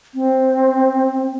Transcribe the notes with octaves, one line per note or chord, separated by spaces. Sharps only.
C4